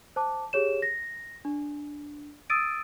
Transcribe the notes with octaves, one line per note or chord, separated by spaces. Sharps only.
C5 A5 D6
G4 G#4 C#5 E7
A#6
D4
D#6 E6 A6 D7 D#7